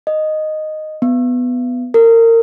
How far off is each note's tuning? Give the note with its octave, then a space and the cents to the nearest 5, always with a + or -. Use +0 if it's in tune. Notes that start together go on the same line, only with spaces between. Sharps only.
D#5 -5
B3 +10
A#4 -30